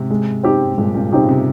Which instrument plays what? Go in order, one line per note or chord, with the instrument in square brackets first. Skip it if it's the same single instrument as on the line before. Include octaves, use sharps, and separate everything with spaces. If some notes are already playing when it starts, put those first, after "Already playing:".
Already playing: [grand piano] G#2 C3
[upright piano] G#3
C4 D#4 G4
[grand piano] G#2
[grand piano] G2 A#2 [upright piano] G#3
[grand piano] G2 A#2
[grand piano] G#2 C3 [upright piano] C4 D#4 G4
[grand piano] C#3
C3